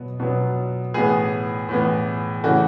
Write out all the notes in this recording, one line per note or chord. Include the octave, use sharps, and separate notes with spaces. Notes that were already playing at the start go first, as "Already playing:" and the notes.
Already playing: B2 F#3 B3
B2 F#3 B3
A2 E3 B3 G#4
A2 E3 B3
C#3 E3 A3 F#4